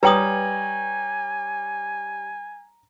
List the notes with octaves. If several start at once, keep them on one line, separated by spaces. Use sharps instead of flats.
G3 B4 C#5 G5 G#5 A#5 D#6 F#7